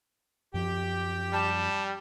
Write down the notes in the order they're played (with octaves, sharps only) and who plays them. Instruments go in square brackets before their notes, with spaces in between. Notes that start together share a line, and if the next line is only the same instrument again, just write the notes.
[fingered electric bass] F#2 F3 [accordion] G4 G5
[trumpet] G3 [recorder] A5